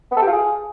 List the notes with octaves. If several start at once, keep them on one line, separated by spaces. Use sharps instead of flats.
B3
A4
G4
F4
G#4